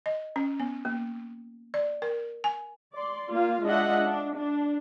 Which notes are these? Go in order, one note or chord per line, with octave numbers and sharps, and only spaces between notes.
D#5
C#4
B3
A#3
D5
A#4
G#5
D5 C6
A#3 F4 F5
G#3 D4 F4 D#5 E5 F#5
D4
D4